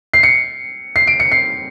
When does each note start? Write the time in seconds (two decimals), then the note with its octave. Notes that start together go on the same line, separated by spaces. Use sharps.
0.14 C7
0.23 C#7
0.96 C7
1.07 D7
1.20 C#7
1.32 C7